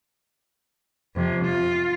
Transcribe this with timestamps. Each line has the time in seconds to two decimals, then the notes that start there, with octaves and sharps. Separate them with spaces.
1.16 F2 C3
1.45 F4